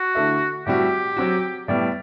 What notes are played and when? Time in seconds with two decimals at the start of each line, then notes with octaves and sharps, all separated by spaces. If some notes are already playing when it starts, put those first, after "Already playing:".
Already playing: F#4
0.15 D3 A3 E4
0.66 A2 G3 C4 F#4 G4
1.17 F#3 C4 F#4
1.68 A2 G3 B3 D5